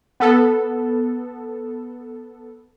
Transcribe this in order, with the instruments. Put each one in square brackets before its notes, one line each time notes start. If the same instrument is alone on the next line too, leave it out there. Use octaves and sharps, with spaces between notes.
[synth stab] B3 A4